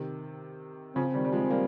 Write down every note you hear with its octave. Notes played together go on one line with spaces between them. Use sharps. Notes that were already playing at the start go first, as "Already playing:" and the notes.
Already playing: C3 D#3
C#3 F3 C4
D#3 G3
G3
F3 G#3
G3 A#3